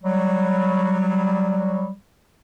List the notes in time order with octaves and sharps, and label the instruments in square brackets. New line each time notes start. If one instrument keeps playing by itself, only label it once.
[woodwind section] F#3 G3